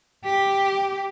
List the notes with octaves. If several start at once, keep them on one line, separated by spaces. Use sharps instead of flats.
G4